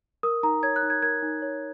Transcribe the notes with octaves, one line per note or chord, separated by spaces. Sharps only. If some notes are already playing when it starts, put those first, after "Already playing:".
A#4 D#6
D#4 A#5
C#5 G#6
F#6
D#4
G#6
A#4 G#6
D#4
C#5